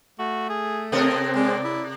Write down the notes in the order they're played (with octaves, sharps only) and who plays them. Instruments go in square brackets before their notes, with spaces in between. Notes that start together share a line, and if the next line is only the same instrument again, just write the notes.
[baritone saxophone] A3 [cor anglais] F#4
[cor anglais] G#4
[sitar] C3 A4 A#4 [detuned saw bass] C4 [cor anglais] D#5
[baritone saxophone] G#3 [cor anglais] D5
[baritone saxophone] E4